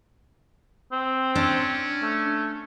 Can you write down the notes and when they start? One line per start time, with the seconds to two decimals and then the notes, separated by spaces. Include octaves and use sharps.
0.92 C4
1.35 C#4 D4
2.02 A3